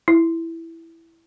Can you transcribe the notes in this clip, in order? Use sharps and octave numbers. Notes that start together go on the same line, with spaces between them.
E4